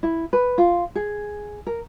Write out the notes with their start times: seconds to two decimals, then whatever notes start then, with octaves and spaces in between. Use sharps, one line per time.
0.03 E4
0.33 B4
0.58 F4
0.95 G#4
1.67 A#4